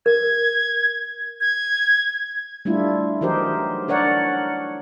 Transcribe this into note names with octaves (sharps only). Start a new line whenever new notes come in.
A#4 G#6
G#6
G3 A3 D4 E4 F4
E3 F#3 D#4 G4 A#4 C5
D4 A#4 C#5 D5 F#5